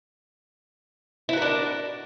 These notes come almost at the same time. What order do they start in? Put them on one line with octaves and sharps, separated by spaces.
E4 F#4 A#4 D4